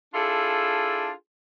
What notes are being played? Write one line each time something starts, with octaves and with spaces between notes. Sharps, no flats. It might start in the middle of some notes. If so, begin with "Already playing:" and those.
D4 E4 F4 G#4 A4